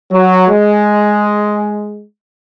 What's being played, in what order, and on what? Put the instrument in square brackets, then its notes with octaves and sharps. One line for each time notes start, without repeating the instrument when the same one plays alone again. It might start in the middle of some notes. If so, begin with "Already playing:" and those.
[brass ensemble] F#3
G#3